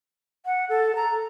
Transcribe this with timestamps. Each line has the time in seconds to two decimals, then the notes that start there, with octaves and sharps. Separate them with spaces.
0.46 F#5
0.69 A4
0.96 A#5